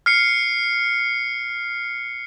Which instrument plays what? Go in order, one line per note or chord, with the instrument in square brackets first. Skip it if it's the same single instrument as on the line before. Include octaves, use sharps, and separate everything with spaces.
[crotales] F6 C7 C#7